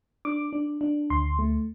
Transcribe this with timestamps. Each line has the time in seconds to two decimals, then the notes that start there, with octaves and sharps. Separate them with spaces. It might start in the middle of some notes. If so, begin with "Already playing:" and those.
0.25 D4 D6
0.53 D4
0.81 D4
1.10 D2 C6
1.39 A3